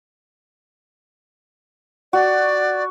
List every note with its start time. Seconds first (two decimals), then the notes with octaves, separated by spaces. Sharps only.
2.13 F#4 D5